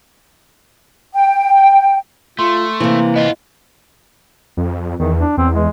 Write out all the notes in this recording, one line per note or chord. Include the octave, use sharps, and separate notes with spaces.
G5
A3 F4 C6
C3 E3 A#3
B3 F4 D#5
F2
E2 D#3
D4
E2 C4
G#3